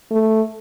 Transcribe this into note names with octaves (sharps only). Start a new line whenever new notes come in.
A3